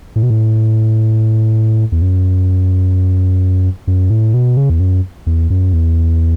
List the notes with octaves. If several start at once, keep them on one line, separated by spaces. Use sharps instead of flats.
A2
B2
A2
E2
F#2
F#2
A2
B2
C#3
E2
F#2
E2
F#2
E2